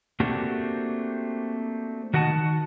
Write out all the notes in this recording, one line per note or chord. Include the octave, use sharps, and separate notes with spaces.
A3 A#3 C4 D4 F#4 G4
D#3 F#4 D#5 F#5 A5